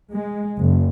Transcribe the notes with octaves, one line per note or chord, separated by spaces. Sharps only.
G#3
F#1